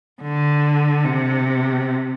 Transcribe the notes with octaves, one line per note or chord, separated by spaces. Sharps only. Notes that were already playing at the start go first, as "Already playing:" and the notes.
D3
C3